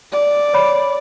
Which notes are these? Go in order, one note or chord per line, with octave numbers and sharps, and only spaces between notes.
D5
C#5 B5